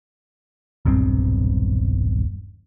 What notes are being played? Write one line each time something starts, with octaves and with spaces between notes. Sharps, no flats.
D#1 B1 G2 C4